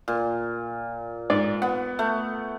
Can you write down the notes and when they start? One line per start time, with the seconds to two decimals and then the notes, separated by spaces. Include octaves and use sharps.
0.08 A#2
1.30 G#2 D5
1.62 B3 F#5
1.99 A3